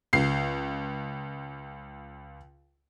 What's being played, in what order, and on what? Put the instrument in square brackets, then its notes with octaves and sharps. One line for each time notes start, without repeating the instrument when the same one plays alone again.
[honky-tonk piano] C#2 C7